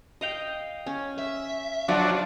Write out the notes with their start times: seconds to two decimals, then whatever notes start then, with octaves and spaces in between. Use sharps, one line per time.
0.21 D#5 F5 G5
0.86 C#4
1.19 E5
1.88 F3 F#3 D4 F4